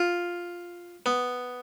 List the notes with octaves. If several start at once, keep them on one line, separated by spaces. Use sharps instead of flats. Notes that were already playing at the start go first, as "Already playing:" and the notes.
Already playing: F4
B3